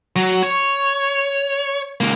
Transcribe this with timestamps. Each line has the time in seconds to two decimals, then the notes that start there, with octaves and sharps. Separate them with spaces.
0.16 F#3
0.43 C#5
2.01 C#2 A#3